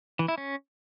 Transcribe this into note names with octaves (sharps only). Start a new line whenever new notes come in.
E3
E4
C#4